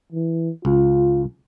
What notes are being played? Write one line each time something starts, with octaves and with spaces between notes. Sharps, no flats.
E3
C#2 F4